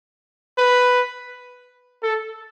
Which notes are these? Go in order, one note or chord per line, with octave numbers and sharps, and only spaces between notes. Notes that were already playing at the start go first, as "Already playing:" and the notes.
B4
A4